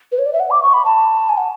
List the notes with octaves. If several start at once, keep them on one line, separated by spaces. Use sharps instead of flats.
B4
C#5
D5
E5
F#5
D6
C#6
B5
A5
G#5
F#5